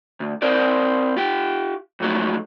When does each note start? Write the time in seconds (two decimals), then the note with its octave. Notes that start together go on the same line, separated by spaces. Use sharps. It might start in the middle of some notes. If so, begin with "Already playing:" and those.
0.20 D2
0.42 C4 A#4 C5 D5
1.17 F4 G4
2.00 F2 G#2 F#3 A3 F4